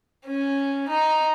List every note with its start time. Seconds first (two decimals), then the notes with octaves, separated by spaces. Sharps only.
0.25 C#4
0.89 D#4